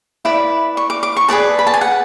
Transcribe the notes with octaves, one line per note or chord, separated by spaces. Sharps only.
E4 B4 D5 B5
C#6
D6
D6
C#6
G#4 B4 D5 A5
B5
A5
G#5
F#5